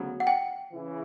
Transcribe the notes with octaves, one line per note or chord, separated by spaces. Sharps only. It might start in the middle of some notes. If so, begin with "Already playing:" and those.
Already playing: D2 C#3 F#3 B3
F#5
G5
C#3 E3